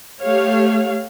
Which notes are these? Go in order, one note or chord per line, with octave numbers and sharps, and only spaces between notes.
A3 G4 C#5 F5